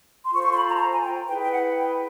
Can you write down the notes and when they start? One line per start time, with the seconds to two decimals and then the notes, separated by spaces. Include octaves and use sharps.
0.23 C6
0.32 F4 A4 C5 C#6
0.44 C#6
0.51 C6
0.55 B5
0.67 A#5
0.75 A5
0.79 A#5
0.92 G#5
1.04 G5
1.27 E4 G#4 B4 G5
1.41 G5
1.51 F#5
1.75 G5